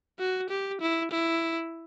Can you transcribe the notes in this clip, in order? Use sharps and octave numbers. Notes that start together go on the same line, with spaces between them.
F#4
G4
E4
E4